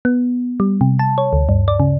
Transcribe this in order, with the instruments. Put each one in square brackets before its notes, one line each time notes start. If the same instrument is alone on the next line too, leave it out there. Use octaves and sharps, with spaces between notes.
[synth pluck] B3
G3
C3
A5
C#5
D2
G2
D5
C#3